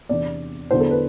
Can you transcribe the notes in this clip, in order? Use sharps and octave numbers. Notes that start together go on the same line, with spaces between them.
E2 C3 E3 B3 D4 D5
E2 D3 F#3 B3 E4 C5
A4
B4